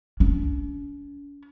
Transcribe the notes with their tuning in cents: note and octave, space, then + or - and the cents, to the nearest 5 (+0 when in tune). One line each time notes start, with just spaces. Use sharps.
C#4 +45